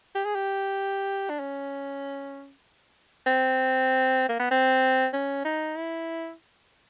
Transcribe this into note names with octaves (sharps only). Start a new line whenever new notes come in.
G4
G#4
G4
D4
C#4
C4
A#3
B3
C4
C#4
D#4
E4